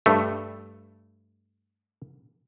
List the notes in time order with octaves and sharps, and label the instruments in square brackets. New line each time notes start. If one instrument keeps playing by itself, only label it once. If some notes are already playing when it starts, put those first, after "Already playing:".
[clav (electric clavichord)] G2 A3